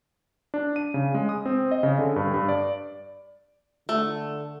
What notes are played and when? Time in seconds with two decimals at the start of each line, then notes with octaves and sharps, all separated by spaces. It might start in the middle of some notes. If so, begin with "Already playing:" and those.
0.54 D4
0.76 D#7
0.94 C#3
1.15 G#3
1.29 D#6
1.45 C4
1.71 D#5
1.83 C#3
1.99 D3
2.16 G2
2.34 G2
2.49 D5
3.89 D3 A3